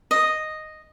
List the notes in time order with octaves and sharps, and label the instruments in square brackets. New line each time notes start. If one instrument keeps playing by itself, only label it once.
[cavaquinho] D#5